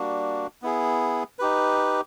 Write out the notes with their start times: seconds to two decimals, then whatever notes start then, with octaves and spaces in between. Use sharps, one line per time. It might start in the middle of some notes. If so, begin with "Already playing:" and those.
Already playing: G3 A#3 D4 F#4
0.62 B3 E4 G#4
1.39 D#4 G4 B4